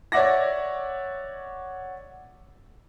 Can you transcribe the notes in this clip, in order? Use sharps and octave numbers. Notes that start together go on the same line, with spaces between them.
C#5 D5 E5 F#5 D6 A#6